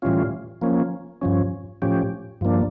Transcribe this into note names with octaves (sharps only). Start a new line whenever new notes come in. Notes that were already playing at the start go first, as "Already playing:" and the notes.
A2 E3 G3 C#4 F4
F3 A#3 C#4
G2 F3 C#4
A2 F3 C#4 G4
G2 F3 A#3 D4